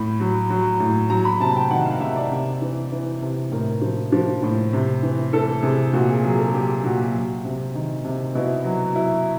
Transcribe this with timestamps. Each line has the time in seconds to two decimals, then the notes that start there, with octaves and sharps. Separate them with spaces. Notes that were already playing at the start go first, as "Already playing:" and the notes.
Already playing: A2 B5
0.20 F#3
0.50 F#3
0.80 A2
1.10 F#3 A#5
1.25 B5
1.40 C3 A5
1.56 G5
1.71 D#3 F#5
1.86 F5
2.00 C3 E5
2.16 D5
2.31 C3
2.62 E3
2.92 E3
3.22 C3
3.52 A2 A#4
3.82 F3
4.12 F3
4.43 A2
4.73 C3
5.03 E3
5.33 E3 A4
5.63 C3 G#4
5.93 A#2 F#4
6.09 G#4
6.24 F#3 G#4
6.39 A4
6.54 F#3 G4
6.84 A#2 F#4
7.14 F#3
7.45 C3
7.75 D#3
8.05 C3
8.35 B2 E4
8.65 F#3
8.95 F#3 E4